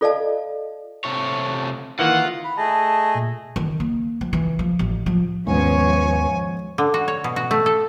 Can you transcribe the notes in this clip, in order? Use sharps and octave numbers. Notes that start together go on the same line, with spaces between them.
F4 A4 D5 D#5 F5 A5
C3 A3 C#5
D#3 E3 A#3 F4 F#5
B5
A3 G#4 D#5 A5
A#2
D#3
A#3
F3
E3
F3
A1
F3
D#2 G#2 F3 B3 C#4 C#5 G#5
D3
F#4
C#5
B2
F#4
A3
A4